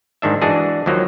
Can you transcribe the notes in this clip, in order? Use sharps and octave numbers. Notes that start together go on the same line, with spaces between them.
G#2 D#3 D4 E5
E3 G#3 D4 F#4 G#4
D#2 F3 F#3 A#3